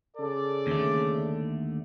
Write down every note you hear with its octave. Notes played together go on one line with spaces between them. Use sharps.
C#3 A4 D5
D#2 D3 A3